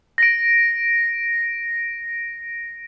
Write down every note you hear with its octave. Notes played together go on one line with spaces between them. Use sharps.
A#6 D7